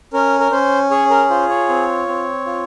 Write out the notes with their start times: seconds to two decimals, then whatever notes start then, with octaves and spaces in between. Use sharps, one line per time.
0.13 C#4 A#4
0.40 A#4
0.52 C#4 C5
0.90 G#4 C#5
1.10 A#4
1.30 F4 C5
1.49 C#5
1.69 C4
2.08 C4
2.46 F4